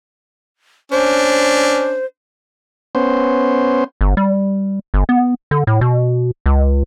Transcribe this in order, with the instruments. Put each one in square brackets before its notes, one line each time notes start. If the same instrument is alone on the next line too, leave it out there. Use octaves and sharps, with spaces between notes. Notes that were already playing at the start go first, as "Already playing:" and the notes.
[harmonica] C#4 D4 [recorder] C5
[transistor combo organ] B3 C#4 C5
[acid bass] G1
G3
G1
B3
D3
A2
B2
C#2